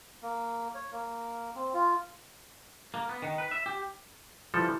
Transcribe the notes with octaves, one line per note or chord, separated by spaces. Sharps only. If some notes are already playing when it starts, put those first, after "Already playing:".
A#3
C#5
A#3
C4
F4
A#3
B3
D#3
B4
E5
G4
E3 F3 G3 A4